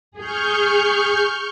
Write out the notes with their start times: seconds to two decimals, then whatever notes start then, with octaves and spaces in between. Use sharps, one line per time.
0.17 G#4 C#6 F6 G6